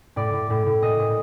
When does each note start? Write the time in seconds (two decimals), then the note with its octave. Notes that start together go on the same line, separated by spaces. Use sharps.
0.16 A2 D5
0.33 A2
0.50 A2
0.66 A2
0.82 A#2 D#5
0.99 A#2